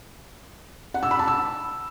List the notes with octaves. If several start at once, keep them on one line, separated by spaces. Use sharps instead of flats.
F#5
E6
B5
A5
E6